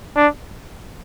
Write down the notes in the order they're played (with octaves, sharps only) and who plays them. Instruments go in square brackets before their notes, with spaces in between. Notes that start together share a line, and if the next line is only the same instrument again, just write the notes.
[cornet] D4